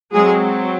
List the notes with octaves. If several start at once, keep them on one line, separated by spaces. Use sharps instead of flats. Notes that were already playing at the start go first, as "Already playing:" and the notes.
F#3 G#3 C4 G#4